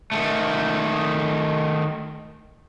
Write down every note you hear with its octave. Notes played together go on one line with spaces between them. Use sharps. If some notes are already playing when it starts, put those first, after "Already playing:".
D#3 A3